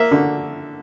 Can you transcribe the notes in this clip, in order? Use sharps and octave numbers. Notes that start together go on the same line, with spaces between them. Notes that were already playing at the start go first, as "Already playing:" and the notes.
Already playing: A#3 E5
D3